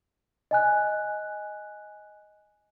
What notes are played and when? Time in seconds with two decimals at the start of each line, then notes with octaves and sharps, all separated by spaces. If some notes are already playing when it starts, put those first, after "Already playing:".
0.51 D#5 G#5 F#6